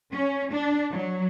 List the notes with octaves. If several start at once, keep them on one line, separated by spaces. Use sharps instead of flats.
C#4
D4
F#3